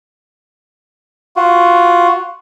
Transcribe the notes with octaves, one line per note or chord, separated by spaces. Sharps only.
F4 F#4